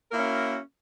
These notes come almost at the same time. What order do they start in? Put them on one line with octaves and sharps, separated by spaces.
A#4 A#3 E4 C#4 F#4